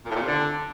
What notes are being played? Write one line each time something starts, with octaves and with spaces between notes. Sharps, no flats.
A#2
A2
A#2
C3
D3